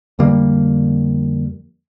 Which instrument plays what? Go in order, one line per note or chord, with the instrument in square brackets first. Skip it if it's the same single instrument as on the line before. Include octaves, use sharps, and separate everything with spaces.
[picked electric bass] F2 D3 G3 A#3